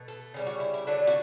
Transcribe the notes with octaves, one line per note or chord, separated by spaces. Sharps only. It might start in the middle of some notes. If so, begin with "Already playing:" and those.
Already playing: B2 A3
A4
C#3 E3 G3
F#4
E4
E4
D3 F#3 A3 D4
F#4